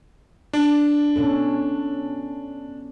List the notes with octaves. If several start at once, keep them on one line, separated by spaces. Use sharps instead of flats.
D4
B2 C#4 A4